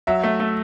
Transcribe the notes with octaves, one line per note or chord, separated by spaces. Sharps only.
F#3 E5
A3
A3